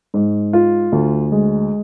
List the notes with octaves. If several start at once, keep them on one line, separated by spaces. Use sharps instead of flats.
G#2
F4
D2
G#3